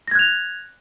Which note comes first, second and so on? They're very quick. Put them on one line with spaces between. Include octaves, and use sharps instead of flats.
A#6 G#6 F#6 F7